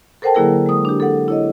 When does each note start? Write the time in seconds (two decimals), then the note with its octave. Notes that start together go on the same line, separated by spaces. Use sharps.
0.22 A4 A#4 C5 F#5 G5 A5
0.34 D3 F#3 A#3 E4 G#4 A#4
0.66 G#3 D#6
0.85 D4 G4
1.00 A4 F#5
1.28 E4 C#5 D#5